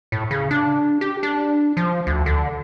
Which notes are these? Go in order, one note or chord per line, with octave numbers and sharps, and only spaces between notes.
A2
C#3
D4
G4
D4
F3
D2
D3